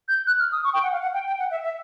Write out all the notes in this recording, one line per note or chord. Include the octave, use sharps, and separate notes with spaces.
G6
F#6
F6
D#6
C#6
G5
F#5
F5
F#5
G5
G5
F#5
E5
E5